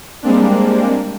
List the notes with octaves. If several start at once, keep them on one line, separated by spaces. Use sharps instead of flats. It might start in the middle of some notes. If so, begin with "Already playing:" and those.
G3 G#3 A#3 C4 D4